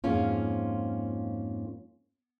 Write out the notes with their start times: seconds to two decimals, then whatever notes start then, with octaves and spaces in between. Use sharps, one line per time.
0.04 F2 G#2 A#3 C#4 F4